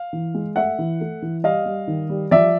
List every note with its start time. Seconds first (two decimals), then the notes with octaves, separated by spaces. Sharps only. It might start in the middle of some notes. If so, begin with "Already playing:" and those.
Already playing: F5
0.13 E3
0.34 G#3
0.56 A3 E5 F#5
0.79 E3
1.01 A3
1.22 E3
1.44 G3 D#5 F5
1.66 G3
1.88 D#3
2.09 G3
2.31 F3 D5 E5